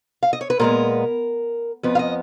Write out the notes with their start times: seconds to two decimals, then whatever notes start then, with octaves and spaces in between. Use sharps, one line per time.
0.23 F5
0.33 D#5
0.41 C#5
0.50 B4
0.59 A#2 G#3 B3 A#4
1.83 F2 F3 B3 B4
1.95 F5
1.99 D#5